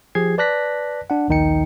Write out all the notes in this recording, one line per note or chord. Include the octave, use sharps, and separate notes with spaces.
F3 G4 G#4 G#6 C7
B4 D5 A5 F#6 A#6 B6
D4 F#5
A#1 D#2 D#3 D#4 G5 C#7